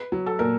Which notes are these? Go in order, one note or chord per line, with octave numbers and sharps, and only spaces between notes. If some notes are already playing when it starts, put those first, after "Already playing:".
Already playing: B4
F#3
A4
A#2 A#4